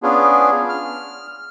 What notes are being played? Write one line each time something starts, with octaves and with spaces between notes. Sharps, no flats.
B3 C#4 D4 F4 G#4
F6